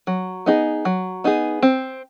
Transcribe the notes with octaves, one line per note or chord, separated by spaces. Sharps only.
F#3
B3 D#4 G#4
F#3
B3 D#4 G#4
C4